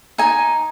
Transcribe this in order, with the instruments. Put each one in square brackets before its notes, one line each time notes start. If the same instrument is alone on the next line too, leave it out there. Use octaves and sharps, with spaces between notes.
[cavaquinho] D#4 G#5